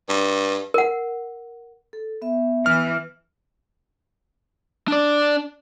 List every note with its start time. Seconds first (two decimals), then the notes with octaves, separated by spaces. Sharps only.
0.09 G2
0.74 A#4 F#5
1.93 A4
2.22 B3 E5
2.66 E3 F6
4.88 D4 D5